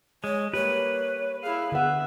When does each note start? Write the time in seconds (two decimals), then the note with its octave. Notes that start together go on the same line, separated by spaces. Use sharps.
0.24 G#3 C#5
0.54 A#3 G4 B4 C#5
1.43 E4 G#4 F5
1.72 D3 B3 E5 F#5